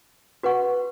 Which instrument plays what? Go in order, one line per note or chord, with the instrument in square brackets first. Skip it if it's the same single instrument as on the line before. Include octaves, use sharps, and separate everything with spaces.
[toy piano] F#4 B4 F#5 C#6